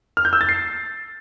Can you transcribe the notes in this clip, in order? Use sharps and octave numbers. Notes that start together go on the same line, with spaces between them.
F6
G6
E6
A6
C7